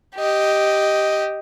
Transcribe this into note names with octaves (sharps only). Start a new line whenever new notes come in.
G4 D#5